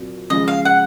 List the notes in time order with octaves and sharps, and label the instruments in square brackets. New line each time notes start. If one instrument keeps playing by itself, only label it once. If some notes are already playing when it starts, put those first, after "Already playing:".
Already playing: [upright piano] A#2 F#3 C4
[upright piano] C#3 F3 G#3 [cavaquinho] D#5
[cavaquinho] F5
F#5